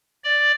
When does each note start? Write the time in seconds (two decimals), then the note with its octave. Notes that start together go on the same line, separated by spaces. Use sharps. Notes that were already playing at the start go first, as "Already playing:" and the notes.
0.24 D5